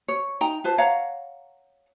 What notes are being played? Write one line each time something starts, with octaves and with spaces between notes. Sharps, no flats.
C#5
D#4 G5 A#5
F4 B4 C5 A5
C#5 F5 F#5 A#5